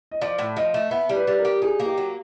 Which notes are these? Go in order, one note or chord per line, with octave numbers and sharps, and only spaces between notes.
D#5
F3 D5
A2
F3 D#5
A3
B3 E5
G3
B4
G3
A#4
G4
D#4 G#4
A#3
G4
F#3